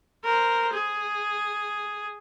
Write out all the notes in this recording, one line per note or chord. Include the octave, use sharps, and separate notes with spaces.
A#4 C5
G#4